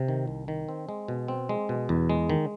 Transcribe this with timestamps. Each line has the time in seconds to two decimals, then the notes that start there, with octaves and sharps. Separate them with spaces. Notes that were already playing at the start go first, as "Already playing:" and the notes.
Already playing: C3
0.08 D#3
0.27 C2
0.48 D#3
0.69 C4
0.89 G#3
1.08 B2
1.28 C4
1.49 G#3
1.69 B2
1.89 E2
2.10 G#3
2.30 D#3